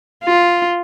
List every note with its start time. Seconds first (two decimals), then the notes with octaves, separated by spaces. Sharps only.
0.24 F4